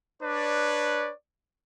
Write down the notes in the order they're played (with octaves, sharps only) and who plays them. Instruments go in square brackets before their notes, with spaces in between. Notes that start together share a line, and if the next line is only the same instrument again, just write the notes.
[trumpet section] D4 B4 C#5 D5